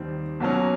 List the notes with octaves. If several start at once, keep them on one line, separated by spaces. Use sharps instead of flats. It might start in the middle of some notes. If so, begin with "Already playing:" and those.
Already playing: D#2 D#3 G3 C4
B1 B2 F#3 A#3 C#4